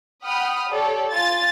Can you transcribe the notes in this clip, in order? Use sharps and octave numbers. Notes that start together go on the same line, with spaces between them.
F#5 G5 B5 D#6 F6
G4 A4 C#5 D5
F4 G#5 A6